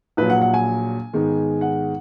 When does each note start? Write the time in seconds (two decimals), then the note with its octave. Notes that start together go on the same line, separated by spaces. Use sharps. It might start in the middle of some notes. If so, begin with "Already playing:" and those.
0.17 A#1 A#2 F#3 B4
0.30 F#5
0.42 F#5
0.54 G#5
1.13 G#2 D#3 G#3 B3
1.61 F#5